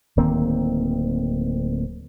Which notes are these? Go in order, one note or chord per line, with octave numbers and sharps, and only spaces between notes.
D1 D#3 A#3 C4